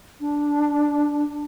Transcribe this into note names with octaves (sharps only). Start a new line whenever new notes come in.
D4